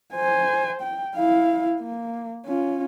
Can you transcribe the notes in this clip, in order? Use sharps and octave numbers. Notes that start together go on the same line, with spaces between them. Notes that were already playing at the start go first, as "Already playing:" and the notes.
C5 G#5
G5
E4 F5
A#3
C#4 F4